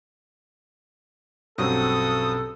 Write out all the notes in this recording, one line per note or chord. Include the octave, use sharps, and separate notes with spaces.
A#1 G2 B2 F#3 C4 C#4 A4 D#6